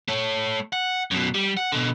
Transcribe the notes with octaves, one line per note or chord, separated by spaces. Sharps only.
A3 C#5
F#5
F#2 B2
G3
F#5
B2 D3